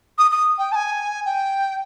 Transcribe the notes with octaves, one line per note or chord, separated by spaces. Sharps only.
D#6
D#6
G5
A5
G#5
G5